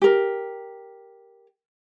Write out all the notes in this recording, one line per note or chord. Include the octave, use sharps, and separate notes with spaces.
G4 A#4